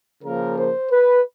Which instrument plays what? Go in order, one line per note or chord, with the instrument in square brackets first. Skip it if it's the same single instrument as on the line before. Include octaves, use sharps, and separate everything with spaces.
[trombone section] C#3 F3 A#3 A#4
C5
B4